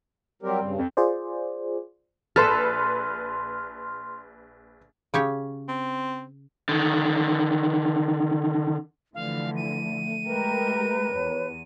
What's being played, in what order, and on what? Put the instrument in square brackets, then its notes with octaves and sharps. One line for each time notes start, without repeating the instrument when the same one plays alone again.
[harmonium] F#3 G4 A#4 [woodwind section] G3 C4
[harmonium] G2 C#3
[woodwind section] F2
[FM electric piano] F4 G#4 C5 D5
[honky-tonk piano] A#1 B4 [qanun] A4 [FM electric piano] C6 F6
[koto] C#3 G4 C#5
[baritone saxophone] C4
[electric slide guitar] D3 D#3
[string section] D3 E3 F3 [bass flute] A3 [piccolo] F5
[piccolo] D#7
[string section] G#3 G4 A#4 [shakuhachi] B4
[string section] E2 [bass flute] C#5